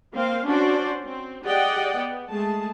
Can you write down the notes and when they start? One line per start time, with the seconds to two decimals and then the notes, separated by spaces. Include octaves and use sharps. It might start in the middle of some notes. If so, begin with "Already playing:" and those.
0.13 A#3 C4 C5 F5
0.44 C#4 D4 F#4 C5 D5
1.03 C4
1.42 G4 G#4 D5 D#5 F#5 G5
1.96 B3
2.29 G#3 A3 G#4 A5